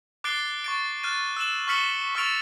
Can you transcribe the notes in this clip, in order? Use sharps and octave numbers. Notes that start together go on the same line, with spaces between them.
D6 F#6 A6 C7 D7 G7
C#6 A6 D7
F6 F#6 A6 D#7
E6 F#6 E7 F#7
C#6 F6 B6 C#7 F#7 G7
C#6 E6 F6 A6 D7 F7